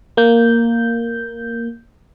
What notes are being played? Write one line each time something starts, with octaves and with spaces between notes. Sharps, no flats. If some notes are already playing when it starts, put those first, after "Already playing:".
A#3 G6